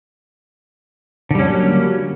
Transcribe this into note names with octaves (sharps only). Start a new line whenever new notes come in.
D3 F#3 G3 A#3 C#4